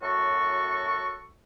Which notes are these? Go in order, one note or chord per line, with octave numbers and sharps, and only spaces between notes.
F#2 A2 F#4 A4 C#6